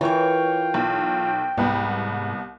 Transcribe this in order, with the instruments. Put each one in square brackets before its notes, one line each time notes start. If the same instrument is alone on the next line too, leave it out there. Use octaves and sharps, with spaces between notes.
[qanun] E3 A#4 [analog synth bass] F4 [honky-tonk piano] C#5 C#6 [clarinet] G5
[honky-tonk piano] B1
[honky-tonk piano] C2 B3 B5 [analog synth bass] G#2